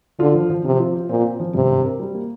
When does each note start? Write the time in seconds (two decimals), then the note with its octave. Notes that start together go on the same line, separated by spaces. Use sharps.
0.19 D3 F4
0.35 F3
0.50 F3
0.65 C3 F3
0.80 F4
0.95 C4
1.09 A#2 C4
1.25 C4
1.40 F3
1.55 G2 C3
1.69 G2
1.85 A#4
2.00 G3
2.14 A#3